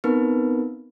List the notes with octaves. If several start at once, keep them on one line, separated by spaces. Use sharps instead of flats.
B3 C4 D#4 A#4 B4